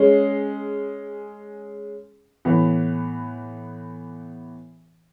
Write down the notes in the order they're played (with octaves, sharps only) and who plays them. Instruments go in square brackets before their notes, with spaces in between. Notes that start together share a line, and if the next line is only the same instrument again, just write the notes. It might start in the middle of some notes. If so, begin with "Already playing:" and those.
Already playing: [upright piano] G#3 C#4 G#4
A2 E3 B3